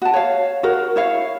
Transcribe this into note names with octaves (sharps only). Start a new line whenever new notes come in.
F#4 A5
C#5 F5
F#4 A#4
E4 C#5 F5